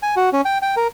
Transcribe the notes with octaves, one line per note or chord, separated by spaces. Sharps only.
G#5
F#4
C#4
G5
G5
A#4